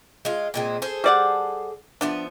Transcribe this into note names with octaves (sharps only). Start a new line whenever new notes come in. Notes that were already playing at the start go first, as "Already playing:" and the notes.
G#3 F4
A#2 G#3 C4
G#4 A4 C5
G3 D5 F#5
F3 B3 D4 E5